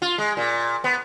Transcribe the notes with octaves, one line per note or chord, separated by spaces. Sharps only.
F4
G#3
A#2
B3